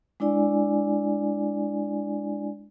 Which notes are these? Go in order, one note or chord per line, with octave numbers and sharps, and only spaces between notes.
G#3 D4 E4 D5 G#5